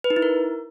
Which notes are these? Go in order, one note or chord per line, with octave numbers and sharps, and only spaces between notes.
B4
D#4
E4
A#4